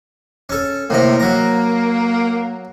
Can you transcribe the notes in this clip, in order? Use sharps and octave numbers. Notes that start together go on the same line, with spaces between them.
C#4 A4
A2 C3 A#3 D#5
F#3 A#5